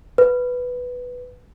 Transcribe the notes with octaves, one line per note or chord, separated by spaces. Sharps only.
B4